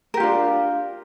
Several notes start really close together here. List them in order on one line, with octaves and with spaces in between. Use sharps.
A#4 G4 F4 D4